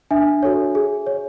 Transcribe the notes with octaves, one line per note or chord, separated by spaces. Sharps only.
D4 E5 G#5
F#4 A4 C#5
G#4
C#5